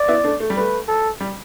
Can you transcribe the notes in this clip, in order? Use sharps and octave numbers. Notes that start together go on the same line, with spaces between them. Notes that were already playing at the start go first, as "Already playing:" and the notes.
Already playing: D5
B3 E4
A3 D4
A3
G3
A3 B4
A4
G3